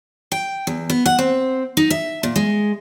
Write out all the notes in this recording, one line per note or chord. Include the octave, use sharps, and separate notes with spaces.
G5
E2
B3
F#5
C4
D#4
E5
A#2
G#3